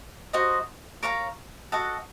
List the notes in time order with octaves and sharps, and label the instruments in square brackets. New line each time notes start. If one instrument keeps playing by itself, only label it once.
[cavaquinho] D#4 F#4 C5 D#5
A#4 C#5 F5 A#5
F#4 A4 D#5 F#5